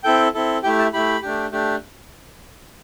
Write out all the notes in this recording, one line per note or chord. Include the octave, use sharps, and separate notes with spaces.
C4 E4 A4 G5
C4 E4 A4
A3 E4 G4 G5
A5
A3 E4 G4 B5
A3 D4 G4
A3 D4 G4